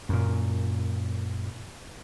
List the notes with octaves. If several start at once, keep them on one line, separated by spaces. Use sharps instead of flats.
F#2 A#2